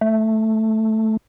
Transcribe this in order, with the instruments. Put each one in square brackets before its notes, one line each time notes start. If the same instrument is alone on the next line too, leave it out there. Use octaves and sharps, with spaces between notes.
[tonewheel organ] A3